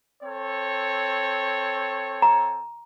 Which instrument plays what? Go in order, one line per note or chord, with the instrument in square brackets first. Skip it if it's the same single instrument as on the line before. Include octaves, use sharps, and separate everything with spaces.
[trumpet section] C4 A4 C#5
[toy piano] A#5